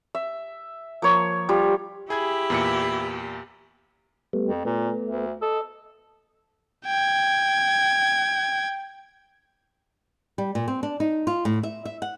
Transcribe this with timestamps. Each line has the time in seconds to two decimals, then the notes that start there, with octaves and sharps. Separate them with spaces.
0.15 E5
1.02 F3 A#3 C#5
1.49 F3 G3 F4
2.10 E4 G4 G#4 G#6
2.50 E2 A#2 C#7
4.33 G3 A3 B3
4.47 F2
4.65 A#2 A3 B3
5.05 D2
5.42 A4 D#5
6.86 G5 G#6
10.38 G3
10.55 A#2
10.68 C4
10.83 D4
11.00 D#4
11.27 F4
11.45 A2
11.63 E5
11.85 E5
12.02 F#5